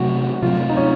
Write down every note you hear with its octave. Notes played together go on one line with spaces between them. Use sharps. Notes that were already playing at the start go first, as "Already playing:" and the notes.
Already playing: C3 F#3 A3 C4 F#4
C3 F#3 A3 C4 F4
D#4
C#4